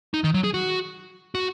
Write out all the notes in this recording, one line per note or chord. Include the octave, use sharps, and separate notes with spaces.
D#4
D#3
F#3
G#4
F#4
F#4